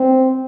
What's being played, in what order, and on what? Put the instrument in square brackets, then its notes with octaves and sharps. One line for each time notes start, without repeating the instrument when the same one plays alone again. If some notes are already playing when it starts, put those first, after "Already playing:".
Already playing: [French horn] C4